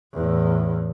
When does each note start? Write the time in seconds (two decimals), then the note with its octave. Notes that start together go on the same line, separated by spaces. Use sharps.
0.13 E2 A2